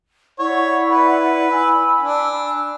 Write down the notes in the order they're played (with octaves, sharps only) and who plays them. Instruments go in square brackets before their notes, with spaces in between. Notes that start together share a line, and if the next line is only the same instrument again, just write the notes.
[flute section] E4 D5 F#5 [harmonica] C#5
[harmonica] B4
[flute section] G#5 B5 E6
[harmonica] D4